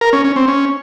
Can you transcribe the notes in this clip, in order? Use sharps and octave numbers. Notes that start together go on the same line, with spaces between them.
A#4
C#4
C#4
C4
C#4